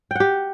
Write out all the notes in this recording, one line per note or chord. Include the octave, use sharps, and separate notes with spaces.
G4 F#5 G5